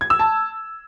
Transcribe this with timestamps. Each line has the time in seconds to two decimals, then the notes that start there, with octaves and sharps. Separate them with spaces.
0.01 G#6
0.10 E6
0.19 A5